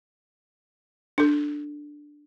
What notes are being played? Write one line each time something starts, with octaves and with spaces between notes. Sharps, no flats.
D4 A4